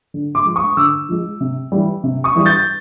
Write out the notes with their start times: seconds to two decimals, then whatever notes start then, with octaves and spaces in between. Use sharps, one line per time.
0.14 D3
0.35 C6 D6
0.45 F3 G#3
0.56 C#6 D#6
0.77 D3 D6 E6
1.09 F3 G#3
1.40 C3
1.72 E3 G3
2.04 C3
2.24 C#6 D#6
2.36 E3 G3
2.45 G6 A6